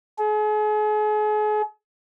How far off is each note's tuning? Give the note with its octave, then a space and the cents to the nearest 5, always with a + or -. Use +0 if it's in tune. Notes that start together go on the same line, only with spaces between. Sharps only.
G#4 +40